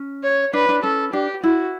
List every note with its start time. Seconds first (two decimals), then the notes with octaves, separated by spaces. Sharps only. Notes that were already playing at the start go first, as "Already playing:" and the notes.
Already playing: C#4
0.23 C#5
0.53 D4 B4
0.69 D4
0.83 C#4 A4
1.13 D4 G4
1.43 E4 F#4